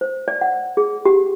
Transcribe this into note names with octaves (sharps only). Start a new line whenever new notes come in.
C5
D5
F#5
G#4
G4